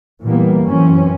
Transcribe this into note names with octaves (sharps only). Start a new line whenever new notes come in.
A#2 E3 G3 A#3 B3
F#2 E3 C4 C#4